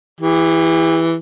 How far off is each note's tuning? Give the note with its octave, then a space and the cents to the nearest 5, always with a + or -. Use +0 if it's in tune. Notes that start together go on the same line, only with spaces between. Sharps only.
E3 +0 G4 +45